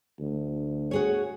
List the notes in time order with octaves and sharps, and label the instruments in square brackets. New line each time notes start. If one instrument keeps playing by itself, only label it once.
[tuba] D2
[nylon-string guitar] F#4 G#4 C#5